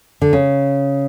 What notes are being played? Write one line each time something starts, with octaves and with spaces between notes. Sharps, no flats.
D3
C#3